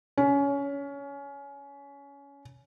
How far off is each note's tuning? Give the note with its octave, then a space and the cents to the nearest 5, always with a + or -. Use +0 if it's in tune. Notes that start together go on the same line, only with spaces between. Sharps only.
C#4 +20